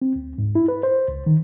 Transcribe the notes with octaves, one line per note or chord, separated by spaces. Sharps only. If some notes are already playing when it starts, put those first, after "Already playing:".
C4
D2
G#2
E4
B4
C5
C#2
D#3